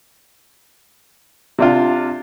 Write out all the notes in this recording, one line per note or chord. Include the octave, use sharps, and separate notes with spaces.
C3 D4 F4